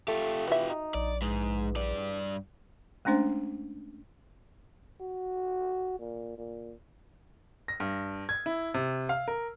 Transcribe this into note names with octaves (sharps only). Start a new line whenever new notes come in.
A3 F4 G4
E3 F#4 E5
D#4
A#1 D5
E2 G#2
G2 D5
G#3 A3 C#4 D4 C5
F#4
A#2
A#2
A#6
G2
G#6
E4
C3
F5
A#4